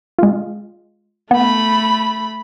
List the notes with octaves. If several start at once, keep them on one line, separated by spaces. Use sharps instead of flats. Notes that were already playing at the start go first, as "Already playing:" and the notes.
G#3 F4
A3 B3 B5